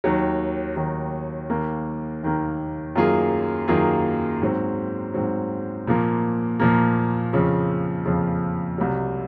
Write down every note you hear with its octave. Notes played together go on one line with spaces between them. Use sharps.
D#2 D#3 F#3
D#2 D#3 F#3
D#2 D#3 A#3
D#2 D#3 A#3
F#2 D#3 A#3 F4 G#4
F#2 D#3 A#3 F4 G#4
G#2 F#3 C4
G#2 F#3 C4
A#2 F3 A#3
A#2 F3 A#3
F2 C#3 F3
F2 C#3 F3
C2 C3 F#3